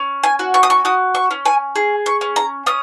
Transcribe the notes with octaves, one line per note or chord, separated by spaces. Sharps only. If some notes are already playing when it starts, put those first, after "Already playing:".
Already playing: C#4
G#5
F#4
C#6
D#6
C#6
F#4 D#6
C#6
C#4
G#5
G#4
C#6
C#4
A#5
C#4 D#6